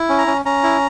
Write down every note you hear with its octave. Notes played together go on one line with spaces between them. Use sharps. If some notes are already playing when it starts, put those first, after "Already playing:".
Already playing: E4
C#4
A#5
C#4
C#4 A#5
E4